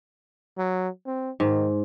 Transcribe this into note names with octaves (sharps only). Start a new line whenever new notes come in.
F#3
C4
G#2 D#3